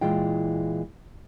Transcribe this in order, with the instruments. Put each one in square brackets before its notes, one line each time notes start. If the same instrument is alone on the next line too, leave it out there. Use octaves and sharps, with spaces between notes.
[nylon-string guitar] A#2 E3 G#3 E4 F4 G5